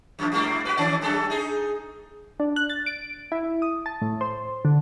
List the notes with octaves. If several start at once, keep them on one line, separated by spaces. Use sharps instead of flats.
F#2 D#3 F3
G#2 G3 A#3
F#4 G4 B4
D#3 C#4 D5
F#2 G3 A4
D#4 G#4
D4
F#6
A6
D7
E4
D#6
A5
A2
C5
D3